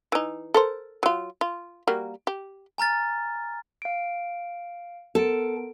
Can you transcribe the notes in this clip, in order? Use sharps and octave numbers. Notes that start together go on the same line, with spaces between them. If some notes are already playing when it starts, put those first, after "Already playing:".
E3 D#4
A4 A#4 C5
F#3 F4
F4
G3 A#3 F#4
G4
G#5 A#5 F6 A6
F5 D7
B3 A4 A#4 D7